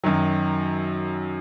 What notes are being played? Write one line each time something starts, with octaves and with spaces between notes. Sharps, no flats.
F#2 D#3 F#3